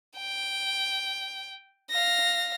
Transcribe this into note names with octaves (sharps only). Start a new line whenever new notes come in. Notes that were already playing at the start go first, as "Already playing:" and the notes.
G5
F5 A#6